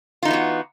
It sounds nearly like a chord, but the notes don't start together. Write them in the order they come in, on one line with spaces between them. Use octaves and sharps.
F4 D#4 E3 B3 F#4